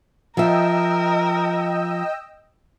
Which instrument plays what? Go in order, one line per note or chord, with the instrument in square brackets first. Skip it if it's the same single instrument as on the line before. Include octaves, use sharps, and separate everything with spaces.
[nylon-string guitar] F3 E5 [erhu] A#4 [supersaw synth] D#5 G5 E6